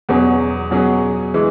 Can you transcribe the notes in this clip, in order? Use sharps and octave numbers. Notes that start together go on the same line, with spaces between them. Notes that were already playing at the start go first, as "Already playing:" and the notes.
E2 B2 F#3 C#4 G#4
B2 F#3 C#4 G#4
E3 G#3